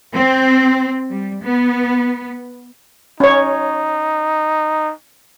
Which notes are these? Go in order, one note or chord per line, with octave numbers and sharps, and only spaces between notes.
C4
G3
B3
C#4 D#4 C#5